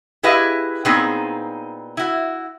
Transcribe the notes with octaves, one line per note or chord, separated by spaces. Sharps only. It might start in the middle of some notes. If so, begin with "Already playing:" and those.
E4 G4 G#4 B4 D#5 F5
A#2 B3 C4 D#4 G#4 C5
E4 F#4